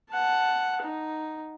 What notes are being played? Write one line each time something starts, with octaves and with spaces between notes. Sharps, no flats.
F#5 A5
D#4